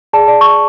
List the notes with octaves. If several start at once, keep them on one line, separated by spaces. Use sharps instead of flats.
G#4 D5 A5
D5
C#6